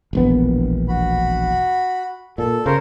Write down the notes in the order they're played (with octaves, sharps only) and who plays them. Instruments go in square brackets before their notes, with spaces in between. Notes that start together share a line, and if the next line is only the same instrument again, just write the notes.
[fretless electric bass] E1 A#1 B3
[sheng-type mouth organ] F#4 B5
[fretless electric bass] A#2 [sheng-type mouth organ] A4
[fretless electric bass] C#3 [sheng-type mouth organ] A#4 C5 C#5